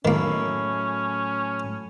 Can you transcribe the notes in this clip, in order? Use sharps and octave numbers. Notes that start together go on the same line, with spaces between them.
A2 D#3 F#3 A#3 C#4 E4